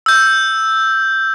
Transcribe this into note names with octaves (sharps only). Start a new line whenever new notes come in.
E6 G6